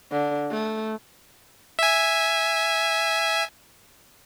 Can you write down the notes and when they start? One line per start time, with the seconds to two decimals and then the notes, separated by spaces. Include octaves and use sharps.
0.12 D3
0.51 A3
1.79 E5 G#5